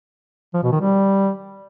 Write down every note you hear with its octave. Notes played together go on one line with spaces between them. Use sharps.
F3
B2
D#3
G3